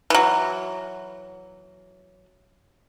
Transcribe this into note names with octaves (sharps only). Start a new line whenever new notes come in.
E3 F#3